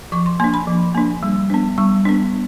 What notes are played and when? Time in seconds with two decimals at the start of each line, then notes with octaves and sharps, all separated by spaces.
0.12 F3 C#6
0.26 C6
0.40 A#3 C6
0.44 D4
0.54 B5
0.67 F3
0.95 A#3 D4
1.23 G3
1.50 B3 D4
1.78 G3 C#6
2.05 B3 D4